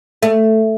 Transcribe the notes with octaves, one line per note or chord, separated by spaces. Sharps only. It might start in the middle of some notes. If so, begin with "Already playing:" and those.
A3